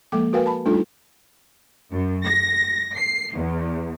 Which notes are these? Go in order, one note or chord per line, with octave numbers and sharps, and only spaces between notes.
F3 G#3 A#3 A4 G5 D6
F#4 A#4 B4 F5 G5 G#5
A5 B5
G3 A3 D4 D#4 F4 A4
F#2
A#6
C7
E2